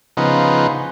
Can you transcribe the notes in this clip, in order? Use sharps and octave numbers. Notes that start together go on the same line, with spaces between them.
C#3 F3 B3 D#4